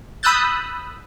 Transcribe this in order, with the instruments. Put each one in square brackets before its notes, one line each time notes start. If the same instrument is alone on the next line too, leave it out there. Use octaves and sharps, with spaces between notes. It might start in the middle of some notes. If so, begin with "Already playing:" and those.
[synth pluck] B5 D#6 E6 F#6 G6 A6